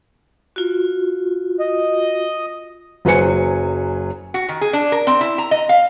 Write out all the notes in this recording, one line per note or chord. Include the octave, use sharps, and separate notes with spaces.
F4 F#4
D#5
F#1 F#3 B4 C5 G#5 C#7
F#4
D#3
G#4
D4
A#4
C4
E4
A#5
D#5
F5